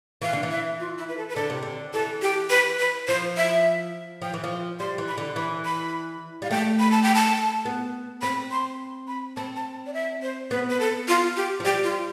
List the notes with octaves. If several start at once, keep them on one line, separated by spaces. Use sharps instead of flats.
E3 F5
D3
E3
E5
F4
E4
B4
A4
B4
D3 A4
C3
D3
E3 A4
G4
B4
B4
F3 C5
E5
F3 G5
E3
F3
G3 C6
E3
B5
D3
E3 B5
B5
G3 F5
A3 G5
B5
A5
G5
A5
B3
C4 B5
C6
B5
C4 A5
A5
D5
E5
C5
B3 B4
B4
A4
F4
G4
F3
G3 G4
F4